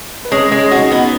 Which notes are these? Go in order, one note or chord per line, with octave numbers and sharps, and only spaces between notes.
B4
G#3 C#4 C#5
G#3
D#4 F#4 D#5
B3